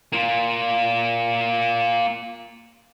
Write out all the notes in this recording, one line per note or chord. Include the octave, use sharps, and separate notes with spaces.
A#3 F4